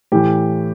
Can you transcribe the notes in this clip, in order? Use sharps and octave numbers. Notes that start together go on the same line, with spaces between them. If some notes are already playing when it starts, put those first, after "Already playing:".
A2 E3 G4